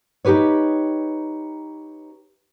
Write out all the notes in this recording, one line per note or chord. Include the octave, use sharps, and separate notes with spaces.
D#4 F4 G4 B4 C#5